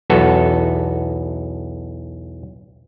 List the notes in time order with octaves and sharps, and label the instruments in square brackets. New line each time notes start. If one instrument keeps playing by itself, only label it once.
[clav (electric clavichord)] B1 E2 B3 F#4 A4